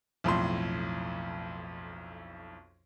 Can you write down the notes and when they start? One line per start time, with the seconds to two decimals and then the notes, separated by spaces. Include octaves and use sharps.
0.24 B1 F2 A2 C6